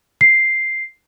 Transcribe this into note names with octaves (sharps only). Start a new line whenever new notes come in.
C7